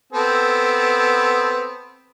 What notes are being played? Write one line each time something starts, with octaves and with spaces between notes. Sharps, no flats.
B3 C4 A4